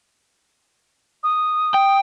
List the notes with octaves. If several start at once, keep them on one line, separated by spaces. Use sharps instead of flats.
D#6
G5